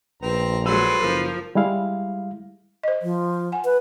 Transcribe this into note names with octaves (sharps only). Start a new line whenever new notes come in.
A#1 C4 B4 A#5
F#3 G#3 A4 B4 C5 E6
F#1 F3 A#4
G3 G#3 E4 F5
C5 D#5
F3
F#5 G#5
B4